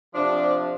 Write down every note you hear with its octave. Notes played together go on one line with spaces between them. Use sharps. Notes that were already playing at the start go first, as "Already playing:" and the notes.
C3 F3 D4